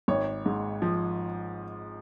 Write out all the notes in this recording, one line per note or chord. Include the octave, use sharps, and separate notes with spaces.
G#1 C#5
G#2
F3